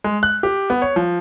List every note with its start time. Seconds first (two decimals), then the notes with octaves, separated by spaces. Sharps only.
0.04 G#3
0.23 F#6
0.43 G4
0.70 B3
0.82 C#5
0.96 F3